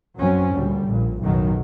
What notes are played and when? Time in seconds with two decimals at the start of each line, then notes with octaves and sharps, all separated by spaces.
0.17 F#2 F#3 C4 C#4
0.52 D2 A#2 D3 G3
0.86 A#1 A#2
1.21 B1 F#2 A2 D#3 F#3